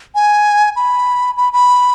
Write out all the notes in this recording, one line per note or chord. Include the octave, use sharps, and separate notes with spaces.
G#5
B5
B5
B5